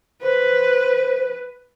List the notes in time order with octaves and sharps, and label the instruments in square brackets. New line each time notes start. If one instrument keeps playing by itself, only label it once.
[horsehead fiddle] B4 [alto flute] C5